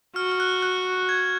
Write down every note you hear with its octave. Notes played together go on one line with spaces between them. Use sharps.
F#4 F6
F6
F#6
F#6
G#6